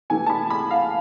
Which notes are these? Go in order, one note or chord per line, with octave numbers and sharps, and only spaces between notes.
C3 E3 A3 G#5
A5
B5
B5
F5